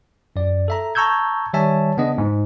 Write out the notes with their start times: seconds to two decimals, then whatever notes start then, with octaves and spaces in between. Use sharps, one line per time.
0.36 F#2 D5
0.68 A4 E5 A#5
0.95 A5 A#5 C#6 E6 G6 G#6
1.53 D#3 G3 C#5 E5 G#5 A5
1.97 C#3 B3 D4 D#5
2.18 G#2